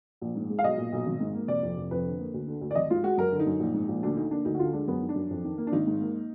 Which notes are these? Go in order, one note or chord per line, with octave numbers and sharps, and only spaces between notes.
A#1
G#2
G#3
F5
B1 D#5
A#2
B1
G#1
G#2
A#3
F1 D5
F2
F1
F2 B4
D3
A#3
D2
D3
D2
D5
G#1 D#5
G#2 F4
G#3 F#4
F#2 A#4
D3
D#4
F#2
A#1
G#2
A#1
D2 D4
D3 D#4
A#3 D4
D2 D#4
F#4
D3 F4
G#3 D4
F#2 B3
D#3
D4
F#2
F2
D#3
A#3
D4
G#1 D#4
G#2
A#3